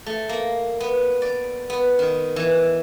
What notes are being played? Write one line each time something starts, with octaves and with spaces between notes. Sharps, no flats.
A3
A#3
B3
D5
B3
D#3
E3